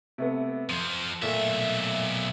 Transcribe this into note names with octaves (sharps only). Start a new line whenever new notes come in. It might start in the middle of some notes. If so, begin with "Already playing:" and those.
C3 A3 B3
F2 F3 D#7
B1 A#2 A3 E5